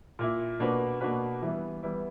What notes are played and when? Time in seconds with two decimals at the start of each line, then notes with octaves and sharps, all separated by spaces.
0.19 A#2 A#3 E4
0.59 B2 A#3 D4 F#4 B4
1.01 B2 A#3 D4 F#4 B4
1.42 E3 G3 B3 E4
1.83 E3 G3 B3 E4